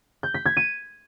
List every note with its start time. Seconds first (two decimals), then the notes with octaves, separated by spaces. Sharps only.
0.23 G6
0.34 B6
0.46 G#6
0.57 D#7